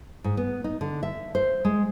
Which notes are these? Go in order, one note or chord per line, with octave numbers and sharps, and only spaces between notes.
G#2
B3
D#4
D3
E5
C5
G#3